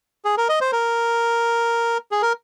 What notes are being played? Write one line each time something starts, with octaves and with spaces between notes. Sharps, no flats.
G#4
A#4
D#5
C5
A#4
G#4
A#4